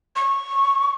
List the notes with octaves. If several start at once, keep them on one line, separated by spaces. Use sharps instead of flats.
C#6